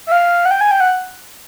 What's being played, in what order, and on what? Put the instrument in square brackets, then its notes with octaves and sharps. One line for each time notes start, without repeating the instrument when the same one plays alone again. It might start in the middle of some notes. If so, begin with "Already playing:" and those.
[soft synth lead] E5
F5
F#5
G5
G#5
G5
F#5